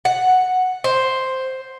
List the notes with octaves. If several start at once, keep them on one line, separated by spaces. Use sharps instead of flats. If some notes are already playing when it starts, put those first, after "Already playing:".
F#5
C5